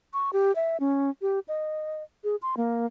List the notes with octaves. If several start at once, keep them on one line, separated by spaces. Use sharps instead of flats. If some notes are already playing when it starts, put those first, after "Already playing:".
C#6
G4
E5
C#4
G4
D#5
G#4
C6
A#3